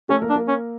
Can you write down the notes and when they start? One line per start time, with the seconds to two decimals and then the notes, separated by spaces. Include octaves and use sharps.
0.09 A3 C#4 A4
0.22 A#3 A#4
0.30 D4
0.35 A#3 A#4
0.48 C#4